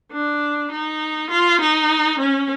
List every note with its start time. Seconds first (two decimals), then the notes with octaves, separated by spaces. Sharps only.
0.13 D4
0.71 D#4
1.31 F4
1.61 D#4
2.19 C#4